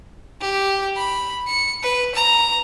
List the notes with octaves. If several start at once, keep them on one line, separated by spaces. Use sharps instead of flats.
G4
B5
C#7
B4
A#5